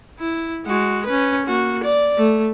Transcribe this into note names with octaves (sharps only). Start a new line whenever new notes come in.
E4
G#3 F#4
C#4 B4
A#3 F#4
D5
A3